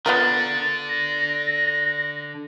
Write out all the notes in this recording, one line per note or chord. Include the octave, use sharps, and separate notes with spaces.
D3 B3 F4 A#4 A6
A#6